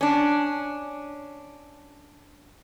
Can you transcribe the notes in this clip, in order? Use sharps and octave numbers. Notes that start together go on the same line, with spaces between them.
C#4 D4